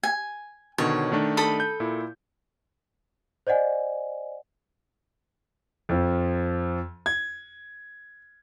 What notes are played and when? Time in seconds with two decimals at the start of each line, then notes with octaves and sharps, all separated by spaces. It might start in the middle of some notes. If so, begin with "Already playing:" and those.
0.03 G#5
0.78 B2 D3 D#3 C#5
1.12 D#3 A3 D4
1.37 A4 B5 D#6
1.60 G6
1.80 A#2 E4
3.47 C5 D5 D#5 F#5 G#5
5.89 F2 F3
7.06 G#6